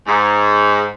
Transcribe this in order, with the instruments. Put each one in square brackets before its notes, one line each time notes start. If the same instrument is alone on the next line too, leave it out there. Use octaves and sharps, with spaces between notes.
[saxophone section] G#2